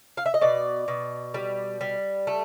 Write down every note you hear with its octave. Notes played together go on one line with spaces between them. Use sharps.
F5
E5
D#5
B2 D5
B2
G3
G3
A3